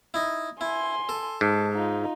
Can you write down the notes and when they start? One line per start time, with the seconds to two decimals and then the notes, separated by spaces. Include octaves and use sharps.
0.14 D#4 E4
0.61 E4 G#5 C6
1.09 A4
1.41 G#2 A5
1.72 D#4 F4